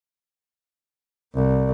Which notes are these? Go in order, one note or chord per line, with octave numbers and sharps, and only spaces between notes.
C2